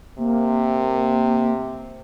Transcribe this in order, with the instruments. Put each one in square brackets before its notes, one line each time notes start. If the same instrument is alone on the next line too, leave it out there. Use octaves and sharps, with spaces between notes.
[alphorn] C3 [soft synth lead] A#3